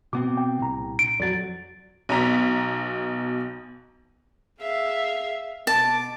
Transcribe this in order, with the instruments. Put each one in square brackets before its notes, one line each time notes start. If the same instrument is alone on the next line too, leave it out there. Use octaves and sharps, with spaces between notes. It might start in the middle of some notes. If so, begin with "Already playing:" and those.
[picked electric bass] B2 B3 C4 [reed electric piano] D6
[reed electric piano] G5
[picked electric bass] C2 [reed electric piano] A#2 A#5
[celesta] D7
[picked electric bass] F2 F#3 [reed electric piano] D5 A6
[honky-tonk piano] B1 B2 A#5 B6
[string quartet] G#4 E5 F5
[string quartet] B2 D6 [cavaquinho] A5